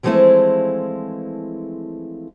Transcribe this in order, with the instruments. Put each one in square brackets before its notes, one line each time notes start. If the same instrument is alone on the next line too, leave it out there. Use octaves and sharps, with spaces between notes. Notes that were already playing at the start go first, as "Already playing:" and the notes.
[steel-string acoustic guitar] E3 F3 G#3 A3 C4 E4